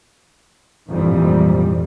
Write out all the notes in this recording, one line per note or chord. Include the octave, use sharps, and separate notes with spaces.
A#1 F2 G#2 E3 G3